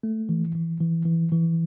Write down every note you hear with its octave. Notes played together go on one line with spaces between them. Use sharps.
A3
E3
E3
E3
E3
E3